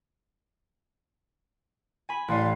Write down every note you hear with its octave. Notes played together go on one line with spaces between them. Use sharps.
G#5 B5
A1 A3 C#5 D5 F5 C6